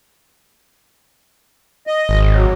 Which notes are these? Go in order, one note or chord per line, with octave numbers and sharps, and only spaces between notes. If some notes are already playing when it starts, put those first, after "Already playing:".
D#5
G#1
F#3